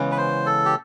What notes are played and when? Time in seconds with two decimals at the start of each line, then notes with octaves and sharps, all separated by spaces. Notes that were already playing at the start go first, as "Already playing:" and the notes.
Already playing: C#3 E3 G#3 B3
0.11 B4
0.18 C5
0.46 A4
0.65 G4